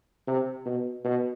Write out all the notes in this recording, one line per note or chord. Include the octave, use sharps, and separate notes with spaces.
C3
B2
B2